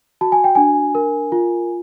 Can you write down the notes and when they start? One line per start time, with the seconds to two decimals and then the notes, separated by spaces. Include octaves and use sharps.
0.21 F#4 A5
0.32 G#5
0.44 G5
0.55 D4 G#5
0.95 A#4
1.32 F4